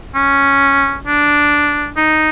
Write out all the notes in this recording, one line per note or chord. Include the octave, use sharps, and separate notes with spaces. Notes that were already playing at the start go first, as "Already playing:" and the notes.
C#4
D4
D#4